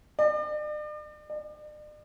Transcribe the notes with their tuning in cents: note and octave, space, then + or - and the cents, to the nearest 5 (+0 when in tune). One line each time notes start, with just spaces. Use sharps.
D5 +45
D5 +45